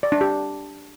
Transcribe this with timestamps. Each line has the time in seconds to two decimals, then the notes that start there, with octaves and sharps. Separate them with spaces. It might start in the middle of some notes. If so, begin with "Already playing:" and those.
0.03 D5
0.12 D4
0.21 G4